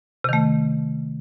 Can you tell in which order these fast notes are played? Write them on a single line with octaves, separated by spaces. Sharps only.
C3 D#3 A3